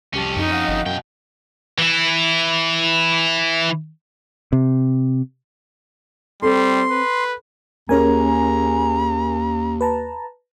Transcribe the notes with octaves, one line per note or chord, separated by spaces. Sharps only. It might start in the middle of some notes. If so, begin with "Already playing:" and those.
C2 F2 C#4 G4 A5
F#2 D#4
D#5 F5 F#5
G1
F#2 B2 G5
E3 E4
C3
G3 C4 A4 C6
B4
D#2 A#3 C#4 G#4 A#4 G#5 A#5
B4 A5 A#5